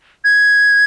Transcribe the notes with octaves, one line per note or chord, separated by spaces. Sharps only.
G#6